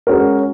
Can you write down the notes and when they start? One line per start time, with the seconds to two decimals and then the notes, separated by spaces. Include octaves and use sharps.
0.07 G#3 C#4 F#4 A#4